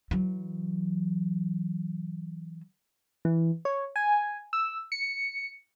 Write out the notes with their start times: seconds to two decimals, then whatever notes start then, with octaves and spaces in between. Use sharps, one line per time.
0.11 E3 F#3
3.25 E3
3.65 C#5
3.96 G#5
4.53 E6
4.92 C#7